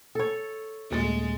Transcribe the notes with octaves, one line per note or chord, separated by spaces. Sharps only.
A4 C#5
D#1 G#3 A3 A6